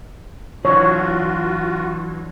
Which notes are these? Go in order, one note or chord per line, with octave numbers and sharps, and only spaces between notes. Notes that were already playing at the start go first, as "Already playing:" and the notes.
E3 F#3 D4 F4 F#4 C#5